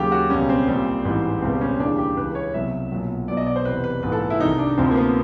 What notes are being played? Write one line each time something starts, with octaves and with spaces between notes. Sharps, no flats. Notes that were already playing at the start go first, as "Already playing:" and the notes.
Already playing: D#2 C#3 F#3 G4
F#4
C#2 B2 G3 C#4
C4
A#1 A#2 G3
A1 G#2 E3 G3
C#2 B2 G3 C4
C#4
D#2 C#3 E3 G3 D4
G4
C#2 C#3 E3 B4
C#5
C2 B2 F#3 E5
B1 A#2 F#3
B1 B2 F#3 D5
D#5
D5
C5
F1 E2 C3 B4
B4
A#1 G#2 E3 B4
A4
E4
C2 C3 D#3 D#4
D4
D2 C3 F3 C4
A#3
B3